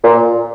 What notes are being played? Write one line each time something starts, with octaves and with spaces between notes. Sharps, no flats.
A#2